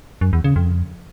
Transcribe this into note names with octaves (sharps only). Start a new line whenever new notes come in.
F#2
E2
C#3
F2